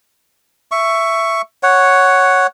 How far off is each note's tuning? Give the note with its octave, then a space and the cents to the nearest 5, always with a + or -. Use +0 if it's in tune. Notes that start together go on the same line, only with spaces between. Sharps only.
E5 +10 C#6 +5
C#5 +0 F#5 +0